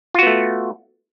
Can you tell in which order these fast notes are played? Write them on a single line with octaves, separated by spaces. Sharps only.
F4 F#4 B3 A3